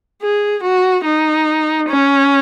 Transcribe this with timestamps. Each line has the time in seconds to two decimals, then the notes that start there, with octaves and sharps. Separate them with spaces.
0.22 G#4
0.63 F#4
1.05 D#4
1.88 C#4